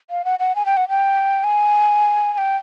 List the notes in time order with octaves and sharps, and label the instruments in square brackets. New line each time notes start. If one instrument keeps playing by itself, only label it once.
[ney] F5
F#5
F#5
G#5
G5
F#5
G5
G#5
G#5
G5